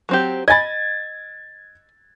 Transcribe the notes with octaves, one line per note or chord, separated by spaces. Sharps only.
F#3 C4 G4
D#5 G#5 B5 G#6 A6